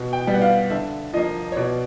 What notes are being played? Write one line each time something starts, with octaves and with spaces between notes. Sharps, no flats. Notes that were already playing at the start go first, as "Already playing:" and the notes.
Already playing: B2
G5
G3 B3
F#5
F5
D3 E5
F3 A#3 D#5
C#5
B2 D5